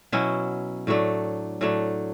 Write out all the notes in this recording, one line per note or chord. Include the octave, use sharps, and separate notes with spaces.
B2 F#3 C#4 E4
A2 F#3 A3 D4
A2 F#3 A3 D4